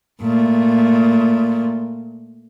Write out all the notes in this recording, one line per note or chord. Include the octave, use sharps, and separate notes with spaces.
A#2 A3